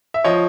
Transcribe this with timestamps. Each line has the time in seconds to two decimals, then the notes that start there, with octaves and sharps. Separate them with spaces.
0.14 E5
0.24 F3 C#5 D#5